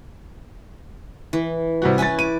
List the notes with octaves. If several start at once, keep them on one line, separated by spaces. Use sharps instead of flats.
E3
C3 G3 F#4
C#4 E4 B4 G#5 A6
D6 D#7